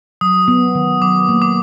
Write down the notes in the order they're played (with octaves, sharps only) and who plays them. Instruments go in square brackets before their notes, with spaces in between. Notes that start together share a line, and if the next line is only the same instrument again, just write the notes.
[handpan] F#3 [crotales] D#6
[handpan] B3
D#3
[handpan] F#3 [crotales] D6
[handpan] A#3
[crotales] D6